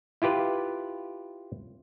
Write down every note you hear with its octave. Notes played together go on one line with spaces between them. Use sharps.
E4 F4 G4 B4